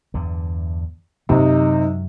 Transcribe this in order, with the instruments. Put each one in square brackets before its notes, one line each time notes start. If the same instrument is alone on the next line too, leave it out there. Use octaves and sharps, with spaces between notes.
[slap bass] E2 G2 D3
[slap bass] F#2 F#3 G#3 [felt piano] C3 [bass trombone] D#4